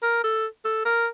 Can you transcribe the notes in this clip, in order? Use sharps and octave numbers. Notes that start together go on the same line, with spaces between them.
A#4
A4
A4
A#4